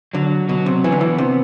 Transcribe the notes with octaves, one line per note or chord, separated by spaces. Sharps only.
D3 F#3
B2 F#3
C3
E3 B3
D3
E3
C3